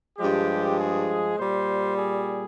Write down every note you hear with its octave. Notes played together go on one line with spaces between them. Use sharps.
G2 F3 G#3 G4
G#4
A#2 G3 C5
G#4